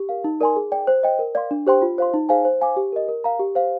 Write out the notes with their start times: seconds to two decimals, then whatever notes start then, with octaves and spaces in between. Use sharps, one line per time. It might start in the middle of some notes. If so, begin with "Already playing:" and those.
Already playing: G4
0.09 A#4 F5
0.24 D#4
0.41 A#4 D5 G#5 C6
0.56 G#4
0.72 D5 G5
0.87 C5
1.03 D#5 G5
1.19 A#4
1.35 D5 F5 C6
1.51 D4
1.67 G4 C5 G5 C6
1.82 F4
1.98 C5 F5 C6
2.14 D#4
2.29 G#4 C5 F5 G#5
2.45 C5
2.61 F5 G#5 D6
2.77 G4
2.92 A#4 D#5
3.08 A#4
3.24 F5 A#5
3.39 G4
3.55 C5 F5